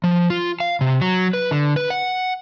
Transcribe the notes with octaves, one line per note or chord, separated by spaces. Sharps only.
F3
F4
F5
C3
F#3
B4
D3
B4
F#5